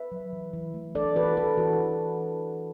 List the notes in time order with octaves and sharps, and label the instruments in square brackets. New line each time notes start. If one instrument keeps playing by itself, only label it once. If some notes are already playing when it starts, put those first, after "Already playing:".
Already playing: [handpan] B4 E5
F#3
E3
E3
A3
D4 A4 D5
E3 F#4 B4
E3 A4
E3 F#4
D4